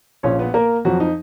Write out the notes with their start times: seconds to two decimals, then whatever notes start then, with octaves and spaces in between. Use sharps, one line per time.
0.23 A#1 A#2 F3 C#4 C#5
0.39 B3 B4
0.54 A#3 A#4
0.85 F2 F3 F#3 F#4
1.00 D#4